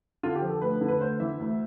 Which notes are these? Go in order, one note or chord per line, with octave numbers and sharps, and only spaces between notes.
D3 F4
G4
F3
A4
D2 B4
D3
B4
D2 C5
E3 E5
D2